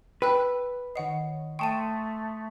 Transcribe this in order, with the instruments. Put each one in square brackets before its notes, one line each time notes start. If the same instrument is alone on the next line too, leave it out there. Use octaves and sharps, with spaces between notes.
[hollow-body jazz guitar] B4 [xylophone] G5 E6 F#6
[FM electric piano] D#3 C#5 D#5 [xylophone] F#5 C7
[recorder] A3 [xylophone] G5 A5 D#7 [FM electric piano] C6 C#6 D#6